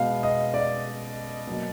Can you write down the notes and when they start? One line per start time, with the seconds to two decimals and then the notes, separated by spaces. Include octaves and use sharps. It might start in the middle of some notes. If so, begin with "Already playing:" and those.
Already playing: B2 G#3 B3 F5
0.23 D#5
0.54 D5
1.47 B2 F#3 A#3